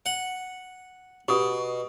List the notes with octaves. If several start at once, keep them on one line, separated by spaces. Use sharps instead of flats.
F#5
B2 G4 D#6